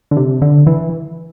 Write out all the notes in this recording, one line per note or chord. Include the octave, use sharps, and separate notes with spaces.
D3
C3
D3
E3